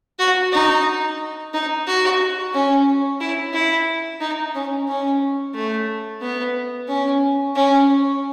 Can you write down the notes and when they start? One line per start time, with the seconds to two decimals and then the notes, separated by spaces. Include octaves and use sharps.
0.19 F#4
0.53 D#4
1.54 D#4
1.87 F#4
2.53 C#4
3.21 E4
3.53 E4
4.21 D#4
4.55 C#4
4.89 C#4
5.55 A3
6.21 B3
6.89 C#4
7.56 C#4